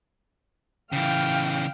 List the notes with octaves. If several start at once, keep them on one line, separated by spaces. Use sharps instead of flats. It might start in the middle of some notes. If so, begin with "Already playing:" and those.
C#3 E3 F5 G5